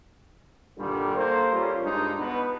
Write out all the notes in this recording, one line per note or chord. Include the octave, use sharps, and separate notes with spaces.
G2 A#2 D3 D#3 G3
A#3 A4 A#4 C5
G3 C#4 F4
G2 G#3 D4 D#4
B2 B4